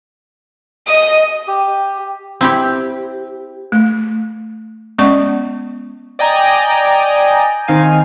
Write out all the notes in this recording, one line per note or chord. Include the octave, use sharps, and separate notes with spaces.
D#5 D#6
G4
C4 E4 G4
A3
G#3 B3 C#4 D5 C#6
D5 D#5 G5 G#5 A#5
D#3 C4 D#4 F5 G#5 D#7